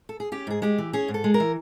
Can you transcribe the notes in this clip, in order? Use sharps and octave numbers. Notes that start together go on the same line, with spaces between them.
A4
G#4
C#4 G4
G#2 G#4
G#3 G4
E3
C#4 G#4
G#2
A4
G#3
A#4
E3